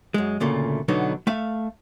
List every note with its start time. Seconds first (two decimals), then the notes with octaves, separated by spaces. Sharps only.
0.14 F#2 G#3
0.40 D2 A#2 C#3 A3
0.88 B2 D3 F#3 B3 D#4
1.27 A3 E5 F5